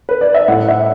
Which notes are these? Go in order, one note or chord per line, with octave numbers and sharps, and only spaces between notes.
B4
D5
E5
A2 F#5
E5